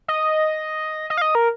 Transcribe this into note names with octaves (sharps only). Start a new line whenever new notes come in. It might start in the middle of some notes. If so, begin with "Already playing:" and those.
D#5
D#5
F5
D#5
A#4